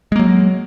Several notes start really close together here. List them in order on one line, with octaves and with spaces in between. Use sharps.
G#3 A#3 F#3